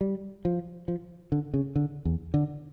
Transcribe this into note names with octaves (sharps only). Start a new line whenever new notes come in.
G3
F3
F3
D3
C#3
D3
E2
D3